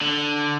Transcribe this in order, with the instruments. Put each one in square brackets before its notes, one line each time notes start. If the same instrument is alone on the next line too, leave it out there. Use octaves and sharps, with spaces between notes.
[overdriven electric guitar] D3